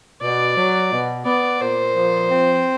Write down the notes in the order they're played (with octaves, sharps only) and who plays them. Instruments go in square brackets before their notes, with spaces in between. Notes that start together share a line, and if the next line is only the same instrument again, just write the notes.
[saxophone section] B2 [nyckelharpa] D5
[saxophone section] F#3
B2
[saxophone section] B3 [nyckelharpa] D5
[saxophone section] A#2 [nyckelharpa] C5
[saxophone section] F3
C4